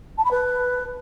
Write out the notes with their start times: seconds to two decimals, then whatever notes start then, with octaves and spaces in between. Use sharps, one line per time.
0.18 A5
0.24 B5
0.31 B4